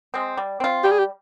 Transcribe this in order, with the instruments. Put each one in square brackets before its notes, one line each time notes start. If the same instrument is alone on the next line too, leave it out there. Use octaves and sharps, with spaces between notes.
[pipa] G#3 C4
G3
C4 F4
[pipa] G3 [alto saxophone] G4
[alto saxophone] G#4
G4